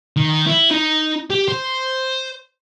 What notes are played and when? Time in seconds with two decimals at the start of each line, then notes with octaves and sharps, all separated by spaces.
0.17 D#3
0.46 E4
0.71 D#4
1.30 G4
1.48 C5